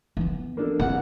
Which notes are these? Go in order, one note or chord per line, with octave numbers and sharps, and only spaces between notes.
E3 B3
A#3 D4 A4
A#1 C3 E3 A#3 F#5